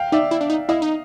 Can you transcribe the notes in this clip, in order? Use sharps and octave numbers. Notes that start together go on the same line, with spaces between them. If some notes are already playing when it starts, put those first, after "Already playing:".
Already playing: F5 G5
D#4 D5 E5
E4
D4
D#4
E4 D#5 F5
D#4